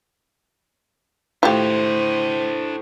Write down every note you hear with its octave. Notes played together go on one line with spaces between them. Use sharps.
A2 D4 F4 G4 C5 E5